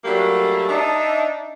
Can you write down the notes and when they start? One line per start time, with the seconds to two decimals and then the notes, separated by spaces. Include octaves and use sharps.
0.05 F#3 G3 A3 A#3 D4 G4
0.69 D4 D#4 E5